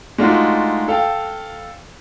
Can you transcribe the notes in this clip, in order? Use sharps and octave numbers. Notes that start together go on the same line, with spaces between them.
G#3 A3 D4 D#4 F4 F#4
A4 F5 G5